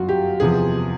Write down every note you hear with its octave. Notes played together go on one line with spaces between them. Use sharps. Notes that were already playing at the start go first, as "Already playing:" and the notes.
Already playing: G1 F#2 D#3 F#3 F4 F#4
G4
E2 C3 F3 G#4